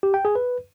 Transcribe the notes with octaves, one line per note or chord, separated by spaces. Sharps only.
G4
G5
G#4
B4